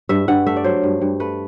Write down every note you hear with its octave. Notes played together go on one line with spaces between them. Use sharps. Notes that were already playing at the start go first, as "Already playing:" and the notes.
G2 E5
G2 F#5
A3 E5
D5
F#3 C5
G2
G2
A3 B4